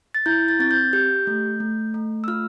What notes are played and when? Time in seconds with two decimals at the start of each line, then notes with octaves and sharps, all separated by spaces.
0.14 A6
0.26 E4 G6
0.48 A6
0.59 C4 A6
0.71 G6
0.93 G4 G6
1.27 A3
1.60 A3
1.94 A3
2.24 E6
2.28 F4 F6